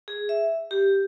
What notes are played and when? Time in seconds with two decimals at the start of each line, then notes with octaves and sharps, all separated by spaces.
0.08 G#4
0.29 E5
0.71 G4